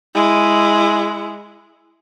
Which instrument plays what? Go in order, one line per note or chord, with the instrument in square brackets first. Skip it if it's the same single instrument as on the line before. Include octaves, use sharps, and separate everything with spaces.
[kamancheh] G#3 E4